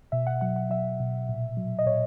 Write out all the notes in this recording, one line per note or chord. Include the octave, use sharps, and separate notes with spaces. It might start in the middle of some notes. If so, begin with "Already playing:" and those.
B2 E5
F#5
F#3 F#5
F#5
F#3 E5
B2
A#2
F#3
D#5
A#2 C#5